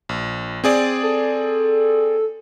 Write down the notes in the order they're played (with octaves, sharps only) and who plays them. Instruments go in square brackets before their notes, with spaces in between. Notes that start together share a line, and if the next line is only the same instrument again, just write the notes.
[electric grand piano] A#1
C4 G#4 D5
[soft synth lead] A4